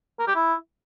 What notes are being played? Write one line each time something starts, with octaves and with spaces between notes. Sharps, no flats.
A#4
G4
E4